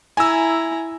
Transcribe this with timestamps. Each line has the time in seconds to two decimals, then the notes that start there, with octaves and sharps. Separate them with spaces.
0.17 E4 G#5 A#5 E6